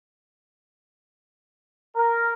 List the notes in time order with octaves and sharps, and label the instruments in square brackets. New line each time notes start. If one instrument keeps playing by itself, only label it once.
[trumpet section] A#4